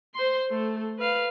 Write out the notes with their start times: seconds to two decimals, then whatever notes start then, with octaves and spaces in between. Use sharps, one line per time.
0.15 C5 C6
0.50 A3 A4
0.99 B4 F5